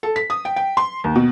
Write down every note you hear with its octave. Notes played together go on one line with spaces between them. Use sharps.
A4
B6
D#6
G5
G5
C6
D#2
B2